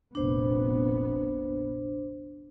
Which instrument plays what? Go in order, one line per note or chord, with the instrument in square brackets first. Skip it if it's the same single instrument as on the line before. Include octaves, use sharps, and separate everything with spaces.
[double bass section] F1 A#1 B3 [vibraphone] D4 C5